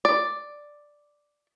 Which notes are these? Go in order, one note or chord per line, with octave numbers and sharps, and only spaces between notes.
D5